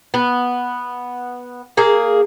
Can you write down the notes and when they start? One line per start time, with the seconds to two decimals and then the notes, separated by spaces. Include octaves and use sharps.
0.14 B3
1.77 A#3 G#4